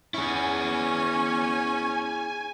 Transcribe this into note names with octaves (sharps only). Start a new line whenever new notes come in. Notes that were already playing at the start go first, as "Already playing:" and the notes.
C#4 E4 G#4 G#5